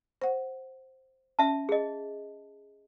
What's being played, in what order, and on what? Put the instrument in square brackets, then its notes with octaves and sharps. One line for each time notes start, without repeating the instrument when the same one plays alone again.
[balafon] C5 F#5
[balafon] C#4 [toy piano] E5 A5
[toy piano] G#4 D#5